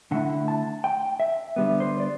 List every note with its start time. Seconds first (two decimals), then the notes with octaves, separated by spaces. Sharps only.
0.11 D3 A3 E4 F#5
0.48 A5
0.84 G5
1.20 E5
1.56 D3 G3 B3
1.80 C5
2.00 D5